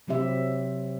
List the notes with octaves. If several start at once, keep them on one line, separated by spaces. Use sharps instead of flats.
C3 F#3 C4 G4 E5